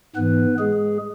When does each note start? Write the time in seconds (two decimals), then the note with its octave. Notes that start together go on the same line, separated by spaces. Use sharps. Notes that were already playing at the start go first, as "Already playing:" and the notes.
0.16 G#2 E3 B3 B4
0.59 G#3 G#4